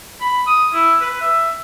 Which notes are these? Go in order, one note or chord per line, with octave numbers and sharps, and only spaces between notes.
B5
D#6
E4
B4
E5